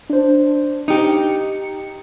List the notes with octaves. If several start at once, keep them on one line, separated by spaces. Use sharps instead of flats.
D4 C5
D#4 G4 C#7